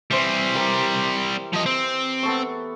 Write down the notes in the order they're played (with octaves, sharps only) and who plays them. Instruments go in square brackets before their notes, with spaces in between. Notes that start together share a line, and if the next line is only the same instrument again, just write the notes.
[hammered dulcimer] E3 C5 [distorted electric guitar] G3 C4
[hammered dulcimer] G4 A#4 C6
[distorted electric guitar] F3 D#5
C4
[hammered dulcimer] B3 A4 C#6